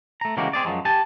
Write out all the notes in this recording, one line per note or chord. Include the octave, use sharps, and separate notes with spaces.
A3 A#5
C#3 E3 G#3 A#3 F#4 G4
C4 G#4 D5
F#2 F3 F#3 G#3
G4 G#5 A5